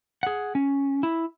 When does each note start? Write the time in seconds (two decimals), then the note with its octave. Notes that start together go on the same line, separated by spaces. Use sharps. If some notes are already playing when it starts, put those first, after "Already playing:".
0.23 G#4 F#5
0.55 C#4
1.03 E4